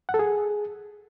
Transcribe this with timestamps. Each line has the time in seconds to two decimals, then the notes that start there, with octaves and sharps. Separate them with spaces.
0.09 F#5
0.14 A4
0.19 G#4